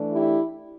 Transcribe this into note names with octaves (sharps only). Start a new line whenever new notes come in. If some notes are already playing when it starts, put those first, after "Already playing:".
Already playing: E3 A3 D4
E4 G4